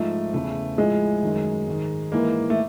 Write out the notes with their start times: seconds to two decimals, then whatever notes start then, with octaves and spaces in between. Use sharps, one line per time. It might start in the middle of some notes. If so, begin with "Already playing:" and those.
Already playing: G#2 F3 A3
0.33 E2 C#3 E3 A3
0.78 A2 F3 G#3
1.23 F#2 D#3
1.67 G#2 D#3
2.12 G#2 E3 A#3
2.50 A3